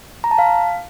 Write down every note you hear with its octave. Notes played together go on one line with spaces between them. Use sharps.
A#5
A5
F5